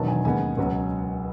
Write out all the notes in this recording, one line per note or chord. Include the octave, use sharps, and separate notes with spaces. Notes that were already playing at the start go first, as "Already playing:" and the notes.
Already playing: E1 E2 D#3 F#3 A5
G#5
D#2 C#3 G#3 B3 G#5
C#2 B2 F#3 B3